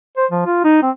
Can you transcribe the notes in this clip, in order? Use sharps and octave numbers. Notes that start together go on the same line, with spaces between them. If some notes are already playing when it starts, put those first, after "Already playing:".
C5
F3
F4
D#4
C4